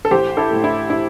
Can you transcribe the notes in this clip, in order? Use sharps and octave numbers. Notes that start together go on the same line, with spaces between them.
A4
A1 G4 C5
E4 A4
A2 A3
E4
E4